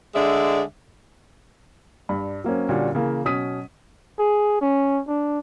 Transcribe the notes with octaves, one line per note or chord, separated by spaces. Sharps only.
D3 G#3 D5 E5
G2 D5 B5
F#3 A#3 C4 C#4
A#2 D3 G3 C#4 F#4
C#3 E3 A#3
B2 F#3 C#4 D#6 B6 D#7
G#4
C#4
D4